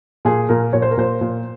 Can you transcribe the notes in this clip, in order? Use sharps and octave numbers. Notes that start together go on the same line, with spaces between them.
A#2 G#4
A#2 A#4
A#2 C#5
C5
A#4
A#2 C5
A#2